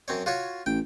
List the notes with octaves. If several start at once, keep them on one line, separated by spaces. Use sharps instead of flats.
F#2 C4 C#5
F4 F#4 C#5
A1 G5